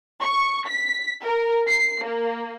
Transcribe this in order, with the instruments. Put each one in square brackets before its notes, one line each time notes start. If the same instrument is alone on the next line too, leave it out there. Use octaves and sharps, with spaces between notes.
[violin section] C#6
B6
A#4
C7
A#3